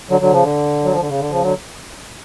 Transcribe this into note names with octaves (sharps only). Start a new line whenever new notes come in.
D3 F#3
D3 F#3
C#3 F3
D3
F#3
F3
D3
C#3
D3
C#3 F3
D3 F#3